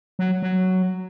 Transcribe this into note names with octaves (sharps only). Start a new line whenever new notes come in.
F#3
F#3